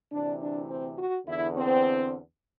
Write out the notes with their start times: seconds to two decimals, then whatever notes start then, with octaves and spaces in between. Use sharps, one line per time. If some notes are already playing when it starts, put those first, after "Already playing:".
0.12 D2 C3 E3 D4
0.40 D4
0.69 C4
0.97 F#4
1.26 E2 D3 E4
1.55 C4